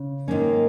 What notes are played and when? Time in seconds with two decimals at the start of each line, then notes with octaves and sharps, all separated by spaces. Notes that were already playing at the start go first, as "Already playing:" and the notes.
Already playing: C#3
0.28 G#2 D#3 A#3 C#4